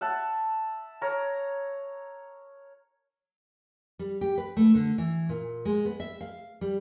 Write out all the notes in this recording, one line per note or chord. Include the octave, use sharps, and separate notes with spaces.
E5 F#5 A5
A#4 C#5 A#5
G3
G4
B4
A3
D3
E3
A#2
G#3
B3
E5
F5
G3